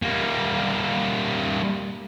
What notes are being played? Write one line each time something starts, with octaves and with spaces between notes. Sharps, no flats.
G3 A#3